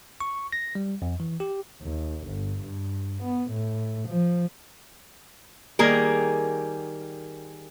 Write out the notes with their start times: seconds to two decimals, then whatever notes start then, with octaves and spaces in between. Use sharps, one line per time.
0.20 C#6
0.53 A#6
0.75 G3
1.02 F2
1.20 E3
1.40 G4
1.82 D#2
2.26 G1
2.61 G2
3.22 B3
3.51 A2
4.09 F3
5.79 D#3 G3 A#3 G#4 A#4